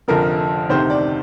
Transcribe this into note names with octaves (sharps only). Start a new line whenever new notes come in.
F1 F2 D3 F3 A#4
D2 C3 D#3 C5
D5